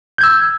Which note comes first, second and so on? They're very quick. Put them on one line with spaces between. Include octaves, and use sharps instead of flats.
G6 G#6 E6